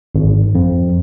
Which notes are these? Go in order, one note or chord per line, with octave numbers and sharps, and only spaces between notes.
G#1
F2